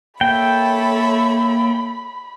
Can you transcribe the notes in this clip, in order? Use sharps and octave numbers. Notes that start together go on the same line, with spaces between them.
A#3 A4 C#5 E5 G5 B5